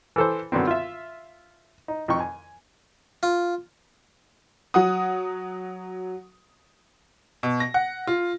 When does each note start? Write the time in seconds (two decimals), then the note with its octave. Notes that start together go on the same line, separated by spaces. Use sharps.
0.16 E3 A4 C5
0.52 F#2 D3 B3 C4
0.67 F4 E5
1.88 D#4
2.08 F2 D#4 G5 C#6
2.20 G#5
3.23 F4
4.74 F#3 F#5 D#6
7.43 B2
7.60 A#6
7.74 F#5
8.07 F4